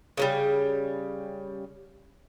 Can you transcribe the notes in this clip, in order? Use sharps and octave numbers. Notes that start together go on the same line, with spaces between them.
C#3 F#3 G3